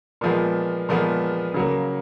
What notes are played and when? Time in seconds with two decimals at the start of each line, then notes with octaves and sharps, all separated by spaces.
0.21 A#2 F3 G#3 B3
0.89 A#2 F3 G#3 B3
1.54 C#3 F#3 A#3